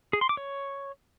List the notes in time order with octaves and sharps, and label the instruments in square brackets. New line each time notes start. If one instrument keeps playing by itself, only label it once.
[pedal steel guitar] G#4
C6
D6
C#5